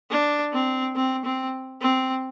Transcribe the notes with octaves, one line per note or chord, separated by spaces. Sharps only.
D4
C4
C4
C4
C4